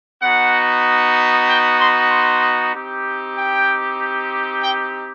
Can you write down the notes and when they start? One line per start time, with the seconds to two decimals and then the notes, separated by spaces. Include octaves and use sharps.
0.22 B3 D#4 F#4 F#5
1.48 G5
1.79 C6
2.11 C6
2.74 C4 D#4 G4
3.36 G5
4.62 G5